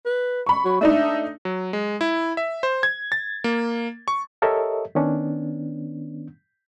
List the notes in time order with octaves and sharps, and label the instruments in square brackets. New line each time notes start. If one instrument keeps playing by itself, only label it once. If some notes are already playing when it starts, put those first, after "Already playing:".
[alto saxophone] B4
[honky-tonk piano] B5 C#6
[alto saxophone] F#3
[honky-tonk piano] A3 D4 D#4 [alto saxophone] E5
[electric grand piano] F#3
G#3
E4
E5
C5
G#6
A6
A#3
C#6
[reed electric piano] G4 A4 A#4 C#5 D#5 E5
D#3 B3 C#4 D4